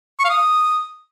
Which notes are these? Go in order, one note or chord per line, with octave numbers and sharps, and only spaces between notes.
C#6
F5
D#6